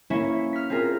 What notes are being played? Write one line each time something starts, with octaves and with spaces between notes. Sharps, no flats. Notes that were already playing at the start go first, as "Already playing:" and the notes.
A#3 C#4 E4 C#5 E5
F6 B6
C4 F4 G#4 A#4